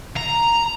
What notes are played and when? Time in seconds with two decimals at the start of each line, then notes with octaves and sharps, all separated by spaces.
0.17 A#5